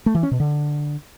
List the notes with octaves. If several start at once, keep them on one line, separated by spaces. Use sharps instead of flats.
A3
E3
C#4
B2
D3